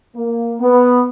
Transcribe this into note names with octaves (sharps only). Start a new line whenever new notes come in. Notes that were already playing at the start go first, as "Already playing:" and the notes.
A#3
B3